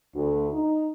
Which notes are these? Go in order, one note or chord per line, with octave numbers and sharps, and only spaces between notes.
D2
D#4